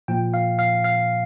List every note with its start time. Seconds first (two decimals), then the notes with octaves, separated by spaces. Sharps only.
0.08 A#2 F3 G5
0.34 F5
0.59 F5
0.84 F5